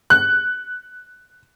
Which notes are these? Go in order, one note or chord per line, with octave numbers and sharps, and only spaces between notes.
F#6